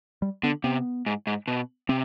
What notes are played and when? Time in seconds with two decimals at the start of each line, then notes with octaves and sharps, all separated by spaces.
0.22 G3
0.43 D3 B3
0.64 C3 B3
1.06 G#2
1.27 G#2
1.47 B2
1.89 C3 C4